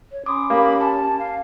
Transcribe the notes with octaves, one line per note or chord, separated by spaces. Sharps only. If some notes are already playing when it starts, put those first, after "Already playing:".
C#5
C#4 B5 C6 D6 D#6
A#3 G4 B5
A5
F5